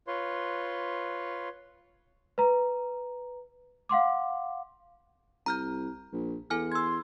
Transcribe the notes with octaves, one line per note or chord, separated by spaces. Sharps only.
F4 B4 C#5 C6
B4 A#5
F5 F#5 C6 D6
C2 A#5 F6 G6
A#1
E2 A4 G#5 F6
C6 E6 G#6